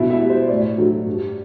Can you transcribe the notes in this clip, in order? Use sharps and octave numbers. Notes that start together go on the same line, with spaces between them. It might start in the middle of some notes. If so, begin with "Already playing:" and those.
Already playing: B2 E4 E5
E4 E5
G3
C5
A2 D5
F#3 A3
G2